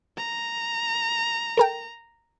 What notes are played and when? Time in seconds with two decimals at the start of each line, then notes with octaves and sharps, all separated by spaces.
0.17 A#5
1.57 A4 A#4 G5